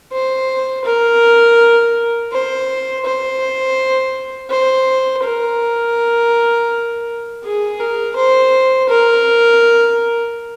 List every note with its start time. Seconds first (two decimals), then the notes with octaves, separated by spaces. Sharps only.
0.12 C5
0.85 A#4
2.32 C5
3.05 C5
4.50 C5
5.24 A#4
7.44 G#4
7.80 A#4
8.16 C5
8.89 A#4